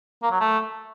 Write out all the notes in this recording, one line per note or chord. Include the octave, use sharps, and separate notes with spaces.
A#3
F#3
A3